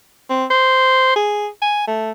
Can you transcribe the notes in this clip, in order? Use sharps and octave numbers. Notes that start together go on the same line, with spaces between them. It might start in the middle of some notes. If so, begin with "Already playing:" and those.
C4
C5
G#4
G#5
A3